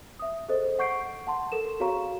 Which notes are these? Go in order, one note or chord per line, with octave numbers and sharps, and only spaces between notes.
E5 D#6
G#4 A4 C5 D#5
F#5 C#6 G6 C7 D7
F#5 A5 C6
A4 A#4 E7
F#4 G#4 C#5 F5 A#5 C#6